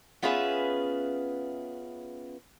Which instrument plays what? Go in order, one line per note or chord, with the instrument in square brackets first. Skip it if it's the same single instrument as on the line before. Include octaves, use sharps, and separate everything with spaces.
[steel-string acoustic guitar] B3 C#4 F4 G#4 B4 E5